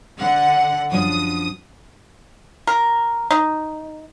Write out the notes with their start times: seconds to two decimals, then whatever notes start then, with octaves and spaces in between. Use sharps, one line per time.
0.18 D3 F#5
0.92 F#2 F3 D4 D#6
2.67 A#4
3.31 D#4